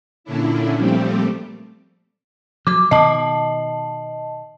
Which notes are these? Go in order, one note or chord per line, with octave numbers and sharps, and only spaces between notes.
A#2 D3 C#4 D4 E4
A#2 F3 G3 A3 C4 G4
F3 F#3 D6
B2 D#3 D#5 A5